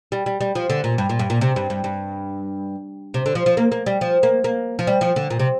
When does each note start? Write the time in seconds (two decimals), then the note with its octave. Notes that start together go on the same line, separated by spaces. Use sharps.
0.12 G3
0.26 G3
0.41 G3
0.55 F3
0.70 D3
0.84 A#2
0.98 G2
1.09 A#2
1.19 G2
1.30 A#2
1.41 C3
1.56 G2
1.70 G2
1.84 G2
3.14 C3
3.26 D3
3.35 F3
3.46 F3
3.57 A#3
3.72 A#3
3.86 G3
4.01 F3
4.23 A#3
4.44 A#3
4.79 F3
4.87 G3
5.01 F3
5.16 D3
5.30 A#2
5.39 C3